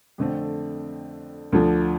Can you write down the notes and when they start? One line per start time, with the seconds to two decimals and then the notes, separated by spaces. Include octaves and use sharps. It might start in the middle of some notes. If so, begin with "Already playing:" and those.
0.18 F2 D3 A3 C4
1.52 D2 D3 F3